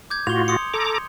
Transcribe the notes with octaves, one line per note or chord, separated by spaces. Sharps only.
D6 G6 G#6
A2 F4 F#4 F7 G7
C6 D#6 C#7
A4 A#5 D6